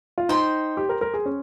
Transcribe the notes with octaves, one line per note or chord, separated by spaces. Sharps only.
F4
D#4 C5 G5 C6
G4
A#4
A#4
G#4
C#4